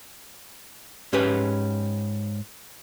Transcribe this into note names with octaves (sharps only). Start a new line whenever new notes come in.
G#2 C#4 G4 B4